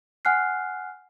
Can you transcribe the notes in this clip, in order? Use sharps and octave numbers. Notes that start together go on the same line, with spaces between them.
F#5 G#5 F6 F#6 C7